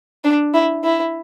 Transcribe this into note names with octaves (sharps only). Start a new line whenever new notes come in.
D4
E4
E4